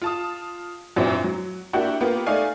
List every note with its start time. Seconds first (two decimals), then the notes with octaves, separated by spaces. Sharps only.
0.02 F4 A5 D#6
0.96 F#2 A#2 E3 C4 D4 E4
1.24 F#3
1.73 A#3 D4 E4 F#4 G4
2.01 A#3 B3 F4 G4
2.26 A3 D#4 D5 F5 G#5